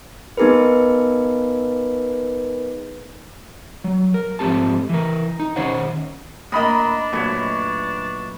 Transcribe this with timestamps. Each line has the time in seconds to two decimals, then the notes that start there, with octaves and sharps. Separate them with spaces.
0.37 B3 D#4 G#4 A#4 B4
3.84 F#3
4.14 A#4
4.39 G#2 F3 A3 C4 G4 A5
4.89 E3 A#4
5.40 D#4
5.56 D#3 C#4 C5 C#5 F#5
6.52 A2 A#3 D4 D#5 A#5 B5 D#6
7.13 F#2 A#2 A3 F#4 B4 C#5